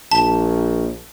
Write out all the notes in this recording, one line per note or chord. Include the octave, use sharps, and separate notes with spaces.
A#1 A5